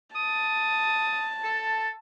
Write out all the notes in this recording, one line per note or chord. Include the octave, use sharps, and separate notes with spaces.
A5 D#6
A4